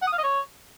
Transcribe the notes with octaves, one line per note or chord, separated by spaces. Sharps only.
F#5
D#6
F5
D#5
C#5